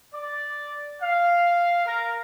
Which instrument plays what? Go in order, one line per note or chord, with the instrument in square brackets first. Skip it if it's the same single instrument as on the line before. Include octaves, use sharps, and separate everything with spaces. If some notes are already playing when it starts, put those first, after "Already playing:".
[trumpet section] D5
F5
A#4